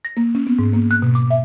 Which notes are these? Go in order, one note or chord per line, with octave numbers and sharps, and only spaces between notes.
A#6
A#3
C#4
B3
G#2
A#3
F#6
B2
D6
E5